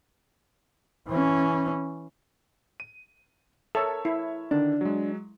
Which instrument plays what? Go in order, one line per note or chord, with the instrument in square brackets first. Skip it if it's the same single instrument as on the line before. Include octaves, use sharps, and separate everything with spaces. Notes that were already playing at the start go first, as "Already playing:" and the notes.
[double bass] E3 C#4
[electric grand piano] D#7
[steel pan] A4 [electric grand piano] A#4 C#5 E5
[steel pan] E4
[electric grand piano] D3 D#3 [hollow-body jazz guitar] D4
[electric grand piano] F#3 G#3